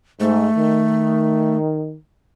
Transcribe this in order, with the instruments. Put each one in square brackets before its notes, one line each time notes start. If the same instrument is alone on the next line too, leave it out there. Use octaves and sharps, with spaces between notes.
[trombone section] G#2 [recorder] A3
[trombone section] D#3